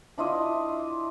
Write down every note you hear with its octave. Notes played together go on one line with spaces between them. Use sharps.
D4 E4 F4 D#5